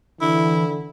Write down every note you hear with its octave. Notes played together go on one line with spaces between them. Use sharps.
D3 E3 E4